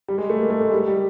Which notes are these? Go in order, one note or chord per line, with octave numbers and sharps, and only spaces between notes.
G3
G#3
A3
A#3
A3
G#3
G3
G3